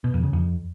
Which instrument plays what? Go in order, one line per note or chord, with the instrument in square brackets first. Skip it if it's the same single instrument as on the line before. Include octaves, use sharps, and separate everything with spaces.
[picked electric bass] B2
F2
C#3
F2